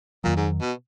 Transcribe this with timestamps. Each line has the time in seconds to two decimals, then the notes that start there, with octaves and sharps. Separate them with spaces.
0.24 F2 A#2 D#3 F#3
0.37 G#2
0.61 B2